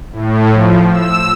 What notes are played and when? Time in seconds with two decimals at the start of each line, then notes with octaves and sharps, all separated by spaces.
0.13 A2
0.53 F3
0.90 E6